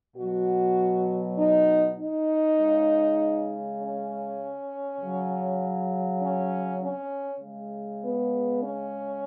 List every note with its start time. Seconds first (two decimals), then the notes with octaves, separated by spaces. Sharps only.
0.16 B2 F#3 F#4
1.38 D#4
1.98 D#4
2.58 C#3 G#3
3.79 C#4
5.00 C#3 F#3
6.21 C#4
6.80 C#4
7.40 C#3 G#3
8.01 B3
8.62 C#4